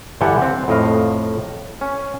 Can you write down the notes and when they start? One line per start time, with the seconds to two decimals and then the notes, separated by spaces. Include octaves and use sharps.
0.21 G2 D3 E3 G4 A4 F#5
0.42 C4
0.68 F2 A2 D#5 F5
1.81 C#4